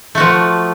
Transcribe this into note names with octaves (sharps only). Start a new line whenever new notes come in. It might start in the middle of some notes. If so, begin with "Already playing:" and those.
F3 A3 F#4